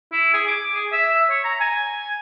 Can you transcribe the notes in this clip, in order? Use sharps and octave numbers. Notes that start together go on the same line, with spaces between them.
E4
G#4
D6
G#4
E5
C#5
A#5
G#5